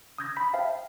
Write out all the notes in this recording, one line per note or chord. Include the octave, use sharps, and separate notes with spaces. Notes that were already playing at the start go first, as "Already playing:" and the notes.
D#6 E6 G6 G#6 A#6
B5 B6
C5 E5 F5 G5 A5